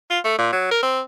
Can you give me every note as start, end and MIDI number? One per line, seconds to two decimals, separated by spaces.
0.10 0.19 65
0.25 0.38 57
0.39 0.48 46
0.53 0.68 54
0.71 0.80 70
0.83 1.01 60